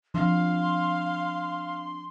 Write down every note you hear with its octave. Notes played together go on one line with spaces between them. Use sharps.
F3 C4 D4 F5 C6